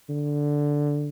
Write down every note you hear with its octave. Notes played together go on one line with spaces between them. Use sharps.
D3